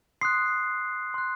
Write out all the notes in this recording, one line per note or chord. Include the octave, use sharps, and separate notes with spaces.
C6 D#6 F#6 C7
C6 D#6 F#6